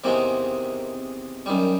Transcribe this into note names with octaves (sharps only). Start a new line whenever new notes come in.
E2 C3 D#3 G#3 A#3 C4
F#2 D#3 G3